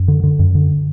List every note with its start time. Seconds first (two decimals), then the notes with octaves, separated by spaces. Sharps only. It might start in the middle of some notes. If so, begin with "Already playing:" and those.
Already playing: F#2
0.08 D3
0.23 D3
0.39 F#2
0.55 D3